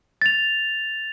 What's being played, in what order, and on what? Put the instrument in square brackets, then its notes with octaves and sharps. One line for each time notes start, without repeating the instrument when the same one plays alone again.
[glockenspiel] A6 F7